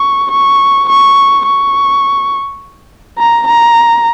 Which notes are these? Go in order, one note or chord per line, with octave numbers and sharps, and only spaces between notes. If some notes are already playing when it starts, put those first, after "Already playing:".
Already playing: C#6
C#6
C#6
C#6
A#5
A#5